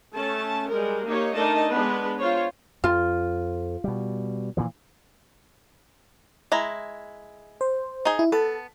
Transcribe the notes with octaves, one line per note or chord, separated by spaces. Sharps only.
A3 C#4 A5
G3 G#3 A#4
A#3 D#4 G4 C#5
A3 D4 D#4 A#4 D#5 A5
G#3 B3 D4 B4
F4 C5 C#5
F2 F4
B2 G3
A#2 E3 F3
G#3 E4 A#5
C5
D#4 G#4
E4
B3 A4 A5